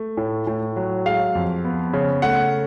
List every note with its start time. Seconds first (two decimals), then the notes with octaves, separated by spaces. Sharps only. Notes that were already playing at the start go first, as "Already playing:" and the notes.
Already playing: A3
0.17 A2
0.47 A2
0.76 F#3
1.06 G#3 F5
1.35 F2
1.64 B3
1.93 C#3
2.22 A3 F#5